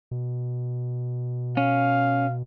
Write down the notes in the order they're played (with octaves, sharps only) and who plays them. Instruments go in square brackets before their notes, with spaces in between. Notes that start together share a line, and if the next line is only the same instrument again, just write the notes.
[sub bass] B2
[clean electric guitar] C#4 [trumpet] F5